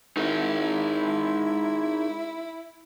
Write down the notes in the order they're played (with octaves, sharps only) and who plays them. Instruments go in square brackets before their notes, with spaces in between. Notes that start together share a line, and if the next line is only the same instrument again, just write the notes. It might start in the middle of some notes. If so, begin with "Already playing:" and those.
[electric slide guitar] D#4 G#4 A#4 [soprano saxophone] E4